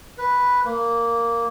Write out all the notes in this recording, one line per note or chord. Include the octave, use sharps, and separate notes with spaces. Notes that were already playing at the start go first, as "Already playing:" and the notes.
B4
A#3